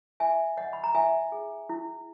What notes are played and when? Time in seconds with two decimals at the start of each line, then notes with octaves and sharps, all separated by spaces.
0.20 E4 E5 G#5
0.57 C#5 D#5 F#5
0.73 B5
0.84 A#5
0.95 E4 E5 G#5
1.32 G#4
1.69 E4